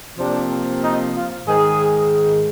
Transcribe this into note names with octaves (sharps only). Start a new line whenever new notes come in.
C3 F3 A#3 D4
D#4
F4
G#2 D#3 G#3 G#4